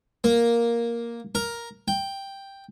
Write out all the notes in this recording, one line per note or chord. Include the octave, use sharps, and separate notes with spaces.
A#3
A#4
G5